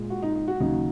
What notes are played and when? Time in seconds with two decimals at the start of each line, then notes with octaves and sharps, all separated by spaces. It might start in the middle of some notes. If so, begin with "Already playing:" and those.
Already playing: A#2 G#3
0.10 F#4
0.23 D#4
0.35 D#4
0.48 F#4
0.60 D#2 C#3 F#3 D#4